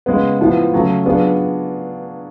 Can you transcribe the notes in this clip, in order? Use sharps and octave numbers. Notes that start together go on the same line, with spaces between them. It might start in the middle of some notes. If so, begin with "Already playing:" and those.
C#3 G#3 B3
A2 F3 B3
C#3 F#3 A3
F#3 B3 D4 F4 G#4